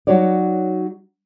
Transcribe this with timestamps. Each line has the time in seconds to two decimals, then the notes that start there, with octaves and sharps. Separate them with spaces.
0.07 F#3 D#4 F#4 C#5 D5